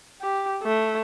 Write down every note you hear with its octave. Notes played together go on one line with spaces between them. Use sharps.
G4
A3